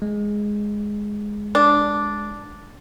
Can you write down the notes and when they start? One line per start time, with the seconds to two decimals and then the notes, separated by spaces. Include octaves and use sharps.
0.02 G#3
1.55 D4